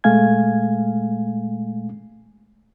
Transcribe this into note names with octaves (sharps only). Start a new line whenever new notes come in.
A#2 G#3 A3 F5 G#5 G#6